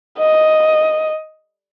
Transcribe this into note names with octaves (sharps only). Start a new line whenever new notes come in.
D#5